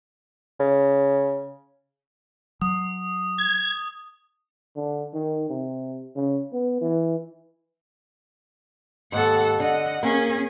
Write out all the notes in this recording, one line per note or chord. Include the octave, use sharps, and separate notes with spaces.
C#3
F#3 D#6
G#6
D3
D#3
C3
C#3
B3
E3
D#2 G#2 A4 F#5
D3 D#5 F#5
A#3 C#4 G#4